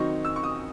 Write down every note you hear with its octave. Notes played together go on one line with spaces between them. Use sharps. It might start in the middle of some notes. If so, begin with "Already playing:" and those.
Already playing: D#3 F#3 C4 D#4 C#6
E6
C#6
D#6